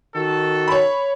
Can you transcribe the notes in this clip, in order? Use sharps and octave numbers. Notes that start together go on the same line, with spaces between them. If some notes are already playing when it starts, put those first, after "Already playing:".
D#3 F#4 A4
C#5 B5